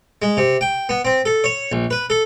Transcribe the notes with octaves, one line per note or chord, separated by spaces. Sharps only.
G#3
C3
G5
B3
C4
A4
C#5
A#1
B4
A4